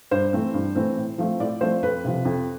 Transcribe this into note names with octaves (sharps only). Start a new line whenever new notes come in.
G2 C5
E3 A3 C4
G2
E3 A3 C4
A2
F3 A3 C4
A2 D5
F3 A3 C4 C5
F2 B4
C3 F3
F2